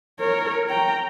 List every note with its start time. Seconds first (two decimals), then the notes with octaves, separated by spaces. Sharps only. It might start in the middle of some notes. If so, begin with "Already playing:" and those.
0.20 A#4 C#5
0.69 G5 A#5